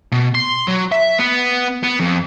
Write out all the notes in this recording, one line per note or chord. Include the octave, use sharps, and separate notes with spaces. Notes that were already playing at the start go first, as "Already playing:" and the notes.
B2
C6
F#3
E5
B3
B3
F2